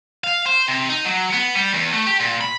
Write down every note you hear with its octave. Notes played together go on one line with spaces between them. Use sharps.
F5
C5
C3
D#4
F#3
B3
G3
E2
A3
G4
A#2
B5